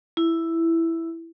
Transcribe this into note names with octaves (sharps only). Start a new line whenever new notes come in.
E4